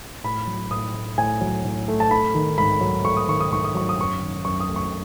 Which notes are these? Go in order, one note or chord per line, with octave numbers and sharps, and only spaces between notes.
A2 B5
F#3
A2 D#6
A3
A2 G#5
F#3
A2
A3
A5
A3 B5
D#3
G#2 B5
F#3
A3 C#6
D#6
D#3 C#6
D#6
G#2 C#6
D#6
F#3 C#6
D#6
F#2 C#6
D#3
F#2 C#6
D#6
A3
C#6